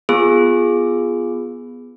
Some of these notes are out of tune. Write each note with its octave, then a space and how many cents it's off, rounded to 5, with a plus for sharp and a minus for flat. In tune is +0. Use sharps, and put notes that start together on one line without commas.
B3 +0 F4 +0 G#4 +0